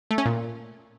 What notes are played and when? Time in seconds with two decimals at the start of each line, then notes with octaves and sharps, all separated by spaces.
0.11 A3
0.18 C#4
0.26 A#2